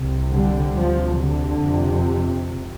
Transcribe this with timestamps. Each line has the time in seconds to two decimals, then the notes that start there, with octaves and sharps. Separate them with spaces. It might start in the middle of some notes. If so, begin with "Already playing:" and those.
Already playing: C2 C3
0.32 D3 G3
0.75 D2 C3 F3
1.18 D3
1.61 F2 C3